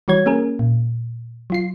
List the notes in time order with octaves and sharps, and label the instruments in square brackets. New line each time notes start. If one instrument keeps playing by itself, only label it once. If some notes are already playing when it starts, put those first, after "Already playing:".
[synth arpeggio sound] E3 G3 F#4 C#5 G#6
A#3 C#4 G#4 A#4
A#2
F#3 F4 C7